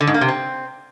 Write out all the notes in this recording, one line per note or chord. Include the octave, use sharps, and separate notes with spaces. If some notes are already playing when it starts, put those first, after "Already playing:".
D3
G#2
A#3
C3
C4